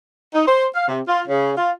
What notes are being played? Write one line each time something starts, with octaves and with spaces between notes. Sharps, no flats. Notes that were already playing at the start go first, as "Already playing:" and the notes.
D#4
C5
F5
C3
F4
C#3
F4